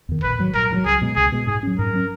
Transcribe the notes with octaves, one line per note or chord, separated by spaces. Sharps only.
E2 D#3
A#1 B4
G#2 D#3 F#3
A#1 A#4
G#2 D#3 F#3
C#2 G#4
B2 G#3
C#2 G#4
B2 G#3
G#2 G#4
F#3 C#4
G#2 A#4
F#3 C#4